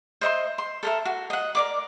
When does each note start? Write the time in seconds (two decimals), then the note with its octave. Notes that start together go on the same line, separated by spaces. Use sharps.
0.21 C5 D#5 E5 C6
0.58 C6
0.83 A4 A#4 E5
1.05 F#4
1.30 D#5 F#5
1.55 A#4 D5 D6